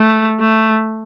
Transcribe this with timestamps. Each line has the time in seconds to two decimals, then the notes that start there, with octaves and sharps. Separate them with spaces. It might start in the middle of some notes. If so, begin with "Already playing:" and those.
Already playing: A3
0.40 A3